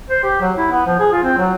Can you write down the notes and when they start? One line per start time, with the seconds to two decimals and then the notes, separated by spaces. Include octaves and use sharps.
0.10 C5
0.23 G4
0.41 F#3
0.57 E4
0.71 B3
0.86 F3
0.99 G#4
1.12 F4
1.24 C4
1.38 F#3